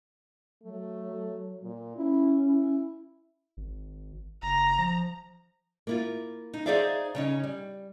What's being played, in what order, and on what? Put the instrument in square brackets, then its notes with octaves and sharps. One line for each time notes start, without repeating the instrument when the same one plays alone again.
[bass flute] F#3 [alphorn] A3
[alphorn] A#2
[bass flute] C#4 [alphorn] E4
[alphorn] E4
[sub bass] G#1
[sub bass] F#1 [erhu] A#5
[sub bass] F3
[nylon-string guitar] A#3 E4 F4
D#4
D#4 G#4 C5 D5 E5 F5
C#3 C#4 D#4
G3